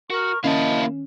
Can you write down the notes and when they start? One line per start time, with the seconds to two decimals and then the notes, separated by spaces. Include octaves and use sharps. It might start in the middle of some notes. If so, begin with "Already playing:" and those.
0.10 F#4 A#4 C#6
0.44 D#3 A#3 C#4 E4 D#5 F5 A5